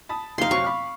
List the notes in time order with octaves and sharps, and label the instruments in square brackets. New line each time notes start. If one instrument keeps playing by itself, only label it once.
[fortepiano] A5 B5 D#6
[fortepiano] F2 C3 D#4 [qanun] F5 C6
[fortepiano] C3 F#3 C4 [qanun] C#6
[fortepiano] B5 D6 F6